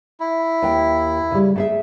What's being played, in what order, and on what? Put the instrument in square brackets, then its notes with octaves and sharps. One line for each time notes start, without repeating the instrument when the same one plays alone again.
[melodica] E4
[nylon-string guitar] D#2 G5
C#3 G3
A3 G#4 E5